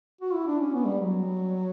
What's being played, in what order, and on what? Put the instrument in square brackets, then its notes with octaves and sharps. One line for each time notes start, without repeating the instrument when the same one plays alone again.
[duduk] F#4
E4
D4
C#4
B3
G3
F#3